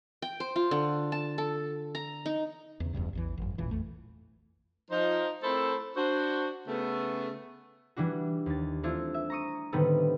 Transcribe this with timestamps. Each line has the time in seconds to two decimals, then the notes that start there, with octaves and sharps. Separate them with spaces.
0.22 G5
0.40 C5
0.56 F4
0.71 D3
1.12 A5
1.38 A4
1.95 A#5
2.26 D#4
2.80 E2 C#3
2.93 E1 E2 G2 C#3
3.13 A1 E2 E3
3.37 G#1 F#2
3.58 E1 A1 A#2 E3
3.71 B1 F2 A3
4.90 F3 D#4 C5
5.43 A3 C4 E4 A4 A#4 C5
5.96 D4 F#4 C5
6.67 C#3 A3 B3
7.96 E3 G3 D4 F#4
8.46 D#2 A6
8.83 A3 C4 D4 E4 F4
9.14 E5
9.30 A#5 C#6 D#6
9.72 A2 D3 D#3 G3 B3 C4